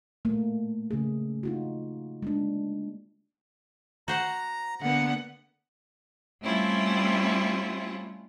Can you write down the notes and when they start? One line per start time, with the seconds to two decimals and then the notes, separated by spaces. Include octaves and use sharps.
0.25 A3 A#3
0.91 C#3 A3 G#4
1.43 D#4 F4 F#4
2.22 G#3 A#3 D4
4.08 F#4 C5 F#5 A#5
4.81 D3 A#3 B3 F#5
6.42 G3 A3 C4 C#4 E4 F4